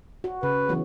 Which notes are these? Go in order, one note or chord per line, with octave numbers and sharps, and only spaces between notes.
F#4
C#3 B4
E3 F#3 B3